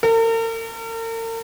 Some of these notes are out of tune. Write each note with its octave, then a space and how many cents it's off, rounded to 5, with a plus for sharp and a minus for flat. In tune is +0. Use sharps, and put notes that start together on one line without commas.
A#4 -45